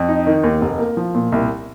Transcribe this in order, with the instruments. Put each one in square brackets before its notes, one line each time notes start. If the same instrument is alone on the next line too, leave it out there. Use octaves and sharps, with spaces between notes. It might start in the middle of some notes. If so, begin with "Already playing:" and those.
Already playing: [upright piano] F2
D#4
D#3
D#2
F1
A#3
F3
A#2
C2